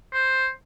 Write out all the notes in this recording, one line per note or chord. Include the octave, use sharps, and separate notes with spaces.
C5